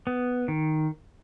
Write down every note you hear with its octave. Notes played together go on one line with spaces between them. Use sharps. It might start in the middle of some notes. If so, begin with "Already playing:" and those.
B3
D#3